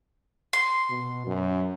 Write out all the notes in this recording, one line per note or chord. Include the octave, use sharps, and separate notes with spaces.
C6
B2
F#2